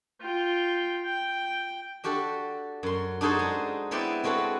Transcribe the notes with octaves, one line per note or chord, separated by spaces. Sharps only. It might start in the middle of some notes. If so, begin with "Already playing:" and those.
F4 G5
G5
D4 F#4 G4 A4
F#2 C6
D4 D#4 F#4 G#4 A4 C5
G#3
B3 C4 E4 B4 C5 D5
G#3 C4 F#4 A4 B4